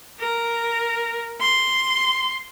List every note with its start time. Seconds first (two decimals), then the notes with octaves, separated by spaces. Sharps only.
0.20 A#4
1.40 C6